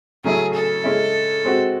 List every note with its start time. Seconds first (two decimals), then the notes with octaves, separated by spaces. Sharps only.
0.24 C#3 F#3 A3 C#4 E4 G#4
0.54 A4
0.84 C#3 G#3 C#4 E4
1.44 G#3 C4 F#4